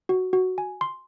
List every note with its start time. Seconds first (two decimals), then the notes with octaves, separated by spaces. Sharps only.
0.09 F#4
0.33 F#4
0.58 G#5
0.81 C6